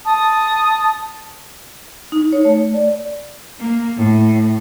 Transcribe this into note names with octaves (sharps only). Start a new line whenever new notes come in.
A5 D#6
D#4
C#5
A3
D5
A#3
A2